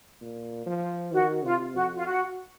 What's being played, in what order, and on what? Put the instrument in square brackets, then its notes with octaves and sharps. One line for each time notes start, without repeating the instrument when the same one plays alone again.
[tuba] A#2
F3
[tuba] D#3 [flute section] F#4
[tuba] C3 [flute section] F4
[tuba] F2 [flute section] F#4
[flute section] F4
F#4